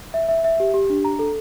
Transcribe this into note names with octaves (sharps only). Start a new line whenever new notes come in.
E5
E5
E5
G4
G4
D4
A#5
A4